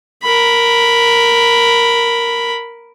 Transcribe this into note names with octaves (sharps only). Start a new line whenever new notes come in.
A#4 B5